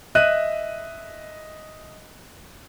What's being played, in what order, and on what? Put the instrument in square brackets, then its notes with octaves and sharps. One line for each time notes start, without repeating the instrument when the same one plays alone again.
[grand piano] D#5 E5 F#6 D#7